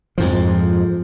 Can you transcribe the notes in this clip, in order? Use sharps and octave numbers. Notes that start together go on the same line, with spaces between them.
F2 G#2 F3